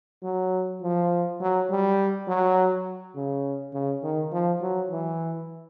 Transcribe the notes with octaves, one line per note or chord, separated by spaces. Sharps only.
F#3
F3
F#3
G3
F#3
C#3
C#3
D#3
F3
F#3
E3